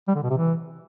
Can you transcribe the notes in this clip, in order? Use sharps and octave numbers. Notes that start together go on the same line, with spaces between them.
G3
D3
B2
C3
E3